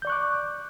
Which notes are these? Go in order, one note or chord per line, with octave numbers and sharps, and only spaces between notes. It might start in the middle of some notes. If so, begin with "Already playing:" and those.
D5 C#6 D6 F#6 G6